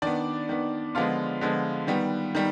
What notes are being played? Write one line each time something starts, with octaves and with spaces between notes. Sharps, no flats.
D#3 B3 D4 D5
D#3 B3
D3 F3 G#3 B3 F4 F5
D3 F3 G#3 B3
D#3 G3 B3
D#3 G3